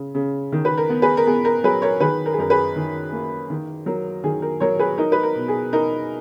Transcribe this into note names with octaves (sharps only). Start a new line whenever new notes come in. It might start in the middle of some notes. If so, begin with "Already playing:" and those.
Already playing: C#3
C#3
D#3
B4
A#4
B3
G#4 B4
A#4
B3 G#4
A#4
F#3 G#4 B4
A#4 C#5
D#3 G#4 B4
A#4
G#4
F#2 A#4
G#4 B4
D#3
A#3
D#3
F#3 A#4
D#3 G#4
A#4
F#3 A#4 C#5
G#4 B4
D#4 A#4
B4
A#4
B2
G#4
D#4 A#4